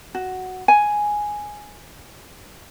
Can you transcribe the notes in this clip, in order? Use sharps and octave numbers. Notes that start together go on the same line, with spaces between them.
F#4
G#5